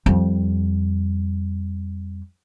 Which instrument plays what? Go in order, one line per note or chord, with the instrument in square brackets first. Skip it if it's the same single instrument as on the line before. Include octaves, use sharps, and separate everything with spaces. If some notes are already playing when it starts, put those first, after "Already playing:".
[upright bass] F2 G3